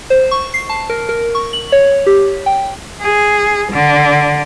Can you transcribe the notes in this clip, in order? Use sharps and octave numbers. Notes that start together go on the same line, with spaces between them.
C5
C#6
C7
A5
A#4
A#4
C#6
F#7
C#5
G4
G5
G#4
D3